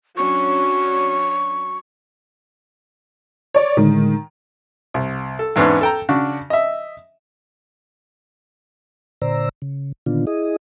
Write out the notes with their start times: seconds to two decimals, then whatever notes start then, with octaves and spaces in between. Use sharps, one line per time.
0.17 F#3 C#4 D4 C#6
3.54 C#5 D5
3.77 A2 D3 D#3 G#3
4.94 C2
5.39 A4
5.56 E2 G#2 B3 C#4 D4
5.81 A4 G5 A#5
6.09 C#3 D4 F#4
6.50 D#5 E5
9.22 A#2 D3 C5 D5 A#5 E6
9.62 C#3
10.06 A#2 D3 D#3 B3 D4 F4
10.27 E4 G#4 D#5 D#6